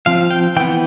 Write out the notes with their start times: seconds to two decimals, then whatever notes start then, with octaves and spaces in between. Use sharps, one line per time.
0.06 F3 C4 F5
0.31 G5
0.56 E3 G5
0.60 B3